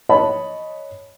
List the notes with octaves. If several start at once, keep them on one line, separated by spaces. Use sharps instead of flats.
C#5 D#5 F#5 A5 B5